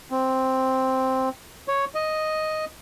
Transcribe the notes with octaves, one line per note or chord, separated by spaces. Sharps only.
C4
C#5
D#5